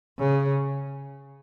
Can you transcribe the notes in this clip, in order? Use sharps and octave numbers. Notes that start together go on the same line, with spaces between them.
C#3